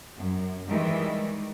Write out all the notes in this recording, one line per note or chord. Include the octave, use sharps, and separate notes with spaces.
F#2
D#3 E3 G3 G#3